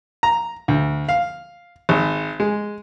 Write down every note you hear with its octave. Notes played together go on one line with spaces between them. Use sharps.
A#5
D2
F5
G#1
G#3